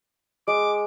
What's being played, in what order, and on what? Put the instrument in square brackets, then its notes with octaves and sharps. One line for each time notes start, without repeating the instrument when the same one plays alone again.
[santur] G#3 [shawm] D6